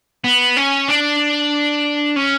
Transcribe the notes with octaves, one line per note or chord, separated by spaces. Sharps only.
B3
C#4
D4
C#4